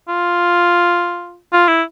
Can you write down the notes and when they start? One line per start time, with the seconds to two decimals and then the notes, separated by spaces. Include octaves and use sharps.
0.08 F4
1.53 F4
1.68 E4